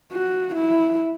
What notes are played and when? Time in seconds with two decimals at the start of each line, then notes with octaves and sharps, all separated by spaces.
0.12 F#4
0.55 E4